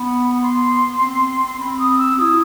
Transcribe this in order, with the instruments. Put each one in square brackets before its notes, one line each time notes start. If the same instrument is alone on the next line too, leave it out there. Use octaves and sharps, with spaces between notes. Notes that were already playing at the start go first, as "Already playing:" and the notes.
Already playing: [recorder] B3 [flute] B5
[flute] C6
[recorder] C4
[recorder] C4 [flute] B5
[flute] D#6
E6
[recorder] F#4 [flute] D#6
[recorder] E4